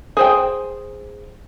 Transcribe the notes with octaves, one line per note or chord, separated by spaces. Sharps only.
G#4 C5 G5